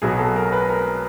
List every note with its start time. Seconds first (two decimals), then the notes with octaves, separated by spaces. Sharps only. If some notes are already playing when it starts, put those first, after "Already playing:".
0.02 B1 B2 F#3 G#4
0.19 A4
0.36 A#4
0.52 B4
0.69 A#4